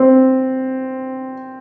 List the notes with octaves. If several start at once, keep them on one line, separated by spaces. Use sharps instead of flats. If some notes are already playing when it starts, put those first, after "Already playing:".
Already playing: C4